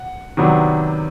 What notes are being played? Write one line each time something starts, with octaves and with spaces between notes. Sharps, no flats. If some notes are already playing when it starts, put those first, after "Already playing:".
Already playing: F#5
C3 D#3 F#3 B3 D4